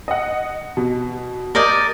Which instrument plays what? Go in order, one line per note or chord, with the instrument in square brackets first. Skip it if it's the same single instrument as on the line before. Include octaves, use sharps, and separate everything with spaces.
[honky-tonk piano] D#5 F#5
B2
[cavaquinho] A#4 D5 D#5 [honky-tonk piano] G6 G#6